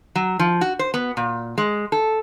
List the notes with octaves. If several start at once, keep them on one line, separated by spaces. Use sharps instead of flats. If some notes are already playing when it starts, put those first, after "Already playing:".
F#3
F3
F#4
C5
B3
A#2
G#3
A4